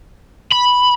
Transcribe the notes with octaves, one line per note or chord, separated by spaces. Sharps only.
B5